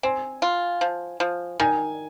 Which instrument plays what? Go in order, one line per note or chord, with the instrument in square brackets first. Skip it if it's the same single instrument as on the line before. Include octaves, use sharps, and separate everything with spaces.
[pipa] C4 [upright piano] G#5
[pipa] F4
F3
F3
[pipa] D#3 [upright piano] G#5